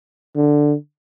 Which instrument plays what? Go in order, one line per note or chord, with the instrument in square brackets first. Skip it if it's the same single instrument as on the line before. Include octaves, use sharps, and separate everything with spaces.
[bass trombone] D3